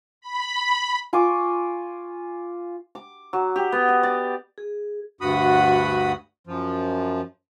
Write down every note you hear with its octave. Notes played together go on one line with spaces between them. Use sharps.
B5
F4 G#5 C#6 D6
D6
F#3
G4
B3
D#5
D5
G#4
D2 G2 F#4 F#5 B5 D#6
F#2 F3